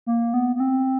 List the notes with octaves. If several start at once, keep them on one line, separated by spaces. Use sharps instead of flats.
A#3
B3
B3
C4